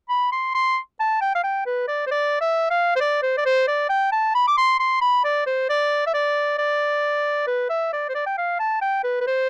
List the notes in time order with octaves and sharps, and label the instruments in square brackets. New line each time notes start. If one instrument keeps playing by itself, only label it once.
[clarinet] B5
C6
C6
A5
G5
F5
G5
B4
D5
C5
D5
E5
F5
C5
D5
C5
D5
C5
D5
G5
A5
B5
D6
C6
C6
B5
D5
C5
D5
E5
D5
D5
B4
E5
D5
C5
D5
G5
F5
A5
G5
B4
B4
C5